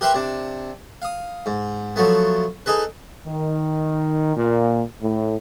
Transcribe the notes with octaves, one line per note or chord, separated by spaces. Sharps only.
G4 A#4 B4 E5 G5 C6
C3 D4
F5 D#6
G#2
F3 F#3 A3 B3
D#4 G#4 A4 B4
D#3
A#2
A2